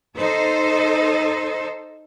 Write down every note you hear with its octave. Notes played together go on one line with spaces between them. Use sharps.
D#4 A4 C5